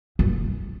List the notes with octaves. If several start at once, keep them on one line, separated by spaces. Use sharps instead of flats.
F#2